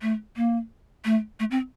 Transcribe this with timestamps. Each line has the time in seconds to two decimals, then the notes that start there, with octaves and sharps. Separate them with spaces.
0.02 A3
0.36 A#3
1.05 A3
1.40 A3
1.51 C4